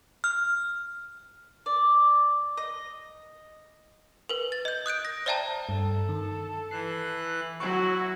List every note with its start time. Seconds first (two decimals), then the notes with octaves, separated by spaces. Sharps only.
0.24 F6
1.66 D5
2.57 D#5
4.29 A#4 B4
4.52 A6
4.65 D#5 G6
4.86 D#6 F#6 G6 D7
5.05 A#6
5.26 C5 D5 E5 G5 A5 A#5
5.69 G2 A4
6.09 D#3
6.71 E3 F#6 C7
7.60 F#3 E4 F#4 C#6